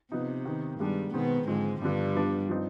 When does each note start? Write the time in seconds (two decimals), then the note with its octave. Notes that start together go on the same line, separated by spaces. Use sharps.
0.12 C3 F3 B3 D#4
0.45 D#3 B3 D#4
0.80 G2 D#3 G3 G#3 B3 D4
1.14 B2 D#3 G#3 B3 C4
1.47 G#2 D3 F3 G#3 C4
1.81 G2 D3 F3 G3 B3 D4
2.15 F3 B3 D4
2.49 F3 C4 D#4